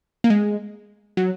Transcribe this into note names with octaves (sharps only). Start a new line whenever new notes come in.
A#3
G#3
F#3